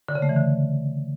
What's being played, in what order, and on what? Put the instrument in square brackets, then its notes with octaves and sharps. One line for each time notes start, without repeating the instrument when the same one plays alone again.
[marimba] D3
C#3
A3
E3
D3